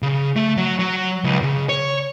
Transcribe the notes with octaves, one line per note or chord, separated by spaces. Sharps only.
C#3
A3
F#3
F#3
C#2
C#3
C#5